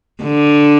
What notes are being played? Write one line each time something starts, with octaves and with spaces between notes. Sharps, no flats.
D3